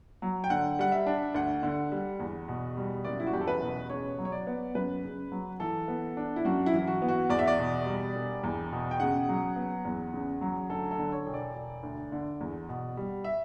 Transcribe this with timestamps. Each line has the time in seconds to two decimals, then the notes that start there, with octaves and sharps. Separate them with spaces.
0.22 F#3
0.44 G5
0.50 D3 F#5
0.79 G3 F#5
0.92 E5
1.07 D4
1.35 D2 F#5
1.63 D3
1.92 G3
2.20 E2
2.48 B2
2.77 G3
3.05 F#1 D5
3.20 E4
3.27 F#4
3.33 E2 G4
3.41 A4
3.48 B4
3.62 B2
3.90 C#3 C#5
4.19 F#3
4.25 C#5
4.32 D5
4.47 B3
4.75 F#2 B4
5.04 C#3
5.32 F#3
5.60 E3 A4
5.88 B3
6.17 D4
6.36 E4
6.45 F#2 F#4
6.66 E4
6.73 E3
6.79 E4
6.87 F#4
7.02 B3
7.08 F#4
7.30 E2 D5
7.39 E5
7.48 D5
7.59 B2
7.86 G3
8.15 E1
8.44 E2
8.72 B2
8.91 G5
9.00 C#3 F#5
9.29 F#3
9.56 B3
9.85 E2
10.14 C#3
10.41 F#3
10.70 D2 A4
10.91 A4
10.98 D3
11.12 C#5
11.26 E1
11.34 D5
11.55 E1
11.83 D2
12.12 D3
12.41 E2
12.69 B2
12.97 G3
13.24 E5